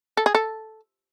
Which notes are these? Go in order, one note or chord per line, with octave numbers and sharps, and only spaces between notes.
A4
G#4
A4